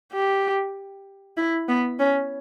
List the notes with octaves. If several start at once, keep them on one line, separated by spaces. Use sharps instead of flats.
G4
E4
B3
C#4